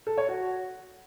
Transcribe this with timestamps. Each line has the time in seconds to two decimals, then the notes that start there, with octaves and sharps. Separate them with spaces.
0.07 A4
0.18 C#5
0.28 F#4